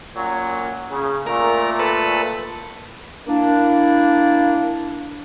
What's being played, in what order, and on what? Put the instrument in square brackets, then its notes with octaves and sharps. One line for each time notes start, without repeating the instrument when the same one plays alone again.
[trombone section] F#2 A#2 F#3
C#3
[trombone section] A#2 A3 [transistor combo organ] A#4
[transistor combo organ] A4 B4
[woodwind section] A#3 D4 E4